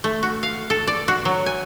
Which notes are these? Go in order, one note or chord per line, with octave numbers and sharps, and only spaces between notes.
A3
F#4
F5
A4
D5
F#4
F#3
G#5